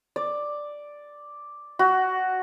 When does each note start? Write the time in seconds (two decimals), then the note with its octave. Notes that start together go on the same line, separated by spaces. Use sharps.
0.16 D5
1.79 F#4